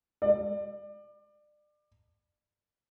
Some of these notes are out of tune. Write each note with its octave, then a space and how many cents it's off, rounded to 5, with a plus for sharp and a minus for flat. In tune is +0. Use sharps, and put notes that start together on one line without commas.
D5 +30